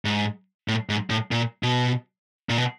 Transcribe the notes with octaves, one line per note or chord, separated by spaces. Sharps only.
G#2
A2
G#2
A2
A#2
B2
A#2
B2